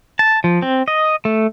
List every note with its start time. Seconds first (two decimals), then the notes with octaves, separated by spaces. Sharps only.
0.19 A5
0.44 F3
0.62 C4
0.88 D#5
1.25 A3